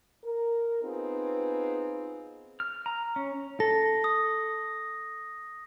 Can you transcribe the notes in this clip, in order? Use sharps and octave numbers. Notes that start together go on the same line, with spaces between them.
A#4
B3 C4 D#4 F4 G#4 B4
F6
A#5
C#4
A4 A#6
D#6